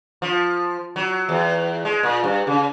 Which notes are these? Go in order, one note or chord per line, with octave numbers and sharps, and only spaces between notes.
F3
F#3
E2
G#3
A#2
G2
C#3